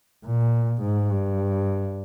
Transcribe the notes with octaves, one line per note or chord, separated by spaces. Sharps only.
A#2
G#2
G2